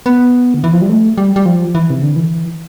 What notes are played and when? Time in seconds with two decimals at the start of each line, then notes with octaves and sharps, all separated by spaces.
0.06 B3
0.54 D3
0.64 E3
0.73 F3
0.82 G3
0.90 A3
1.18 G3
1.36 G3
1.46 F3
1.75 E3
1.90 C3
2.02 D3
2.16 E3